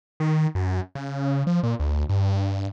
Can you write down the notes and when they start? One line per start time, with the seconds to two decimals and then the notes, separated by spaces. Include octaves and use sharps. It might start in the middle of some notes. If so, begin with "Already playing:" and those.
0.20 D#3
0.55 F#2
0.95 C#3
1.47 F3
1.63 A#2
1.80 D2
2.09 G2